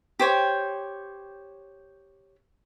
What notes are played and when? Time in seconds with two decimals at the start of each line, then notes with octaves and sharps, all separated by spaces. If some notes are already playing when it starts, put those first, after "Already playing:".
0.19 G4 C5 C#5 G5